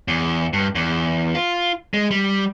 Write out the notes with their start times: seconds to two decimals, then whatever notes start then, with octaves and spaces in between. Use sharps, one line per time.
0.08 E2
0.53 G2
0.75 E2
1.35 F4
1.94 G#3
2.11 G3